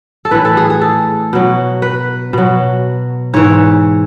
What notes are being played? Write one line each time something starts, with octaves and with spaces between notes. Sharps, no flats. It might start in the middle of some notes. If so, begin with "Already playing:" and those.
A4
A2 E3 B4
A4
G#4
G#4
A4
B2 F#3
B4
B2 F#3
G#2 E3 C#5